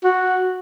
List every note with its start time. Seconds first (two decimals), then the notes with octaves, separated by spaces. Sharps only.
0.04 F#4